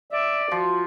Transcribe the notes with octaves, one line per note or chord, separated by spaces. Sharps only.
D5 E5
F3 F#4